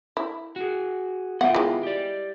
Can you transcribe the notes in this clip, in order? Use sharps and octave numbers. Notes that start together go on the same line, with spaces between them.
E4
F#4 G#4
B3 F4 D#5 E5 F#5 G5
E3 G#3
G4 D5